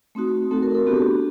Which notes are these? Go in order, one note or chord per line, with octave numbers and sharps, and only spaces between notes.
A3 C4 D#4 F#4
A3 C4 D#4 F#4 A4
A#4
A4
B3 D4 F#4 G4